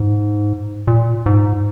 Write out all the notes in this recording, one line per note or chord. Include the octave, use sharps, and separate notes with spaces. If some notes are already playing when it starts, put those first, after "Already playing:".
Already playing: G#2
A#2
G#2